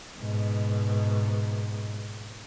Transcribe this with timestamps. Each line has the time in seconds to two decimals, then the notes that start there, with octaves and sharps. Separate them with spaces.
0.19 G#2 B2